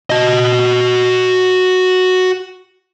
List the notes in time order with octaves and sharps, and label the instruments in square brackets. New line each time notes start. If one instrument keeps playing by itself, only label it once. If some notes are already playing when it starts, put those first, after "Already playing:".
[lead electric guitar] F#4 D#5